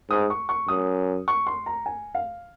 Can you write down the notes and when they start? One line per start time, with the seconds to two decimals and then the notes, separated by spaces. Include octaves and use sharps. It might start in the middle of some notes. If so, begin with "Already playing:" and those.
0.10 G#2 D#6
0.30 C#6
0.49 C#6
0.68 F#2 D#6
1.28 C#6
1.47 C6
1.66 A#5
1.86 G#5
2.15 F5